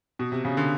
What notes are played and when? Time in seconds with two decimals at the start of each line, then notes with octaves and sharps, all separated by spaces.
0.19 B2
0.32 C3
0.45 C#3
0.57 D3